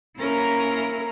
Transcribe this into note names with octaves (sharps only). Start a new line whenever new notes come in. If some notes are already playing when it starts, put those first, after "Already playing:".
A#3 C#4 E4 A#4 A#5 A#6